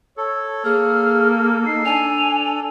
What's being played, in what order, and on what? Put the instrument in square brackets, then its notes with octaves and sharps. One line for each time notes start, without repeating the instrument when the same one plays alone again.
[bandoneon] A4 [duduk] C#5
[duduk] A#3 [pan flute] G#4 [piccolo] F6
[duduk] D#4 [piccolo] C7
[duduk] D4 [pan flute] G#5 [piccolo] F7